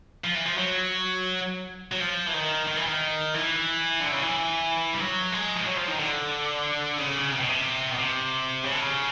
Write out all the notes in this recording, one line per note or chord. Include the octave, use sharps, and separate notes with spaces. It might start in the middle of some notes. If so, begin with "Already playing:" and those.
F3
E3
F3
F#3
F#3
F3
E3
D#3
D#3
E3
D#3
E3
D3
C#3
E3
G3
F#3
G#3
F3
F#3
F3
D#3
D3
C#3
C3
B2
C3
B2
C3
C#3
D3
C#3